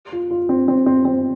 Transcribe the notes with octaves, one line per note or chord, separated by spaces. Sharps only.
F4
F4
C4
C4
C4
C4